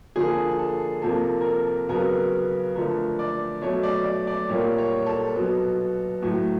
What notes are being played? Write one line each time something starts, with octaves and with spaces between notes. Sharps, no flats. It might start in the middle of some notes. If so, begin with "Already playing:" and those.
D3 F3 A#3 G#4
A4
C3 F3 A#3 A4
A#4
A4
C#3 F#3 B3 A#4
D3 F3 A3 A#4
D5
B2 F#3 A3 C#5
D5
D5
D5
A#2 G3 A#3 C#5
C#5
A4
B2 F#3 B3
A2 F#3 A3